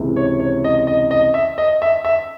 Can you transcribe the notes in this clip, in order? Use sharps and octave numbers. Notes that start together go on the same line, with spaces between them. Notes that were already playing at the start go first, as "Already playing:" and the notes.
Already playing: C#2 C3 E3
C#5
C#5
D#5
D#5
D#5
E5
D#5
E5
E5